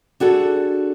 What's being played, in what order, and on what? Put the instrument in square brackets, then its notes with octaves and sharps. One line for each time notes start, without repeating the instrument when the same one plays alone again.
[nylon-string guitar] D4 F#4 G#4 A4